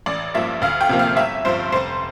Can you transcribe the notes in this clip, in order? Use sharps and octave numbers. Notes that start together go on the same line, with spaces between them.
A1 D5
G2 F3 A#3 E5
D2 F5
G5
C3 F3 A#3
F5
G1 E5
G2 F3 C5
F1 C5